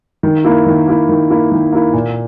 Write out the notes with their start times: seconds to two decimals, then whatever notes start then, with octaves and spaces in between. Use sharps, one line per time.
0.23 D#3
0.45 A#3 E4
0.66 D#3
0.87 A#3 E4
1.09 D#3
1.30 A#3 E4
1.52 D#3
1.72 A#3 E4
1.94 A#2